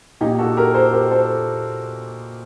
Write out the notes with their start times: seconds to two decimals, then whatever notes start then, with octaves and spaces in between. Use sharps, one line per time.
0.21 A#2 D#4 G4
0.38 F#4 A4
0.57 G4 A#4
0.74 A4 C5
0.92 G4 A#4
1.11 A4 C5